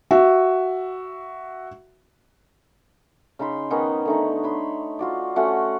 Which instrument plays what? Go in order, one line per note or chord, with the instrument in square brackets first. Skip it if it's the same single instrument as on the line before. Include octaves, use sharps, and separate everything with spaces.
[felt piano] F#4 E5
[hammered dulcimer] C#3 D#4 B5 C6
D#3 B3 C#4 D#4
D3 A3 D#4
C#5 B5 C6
F4 F#4 D5
A3 C#4 F#4 F#5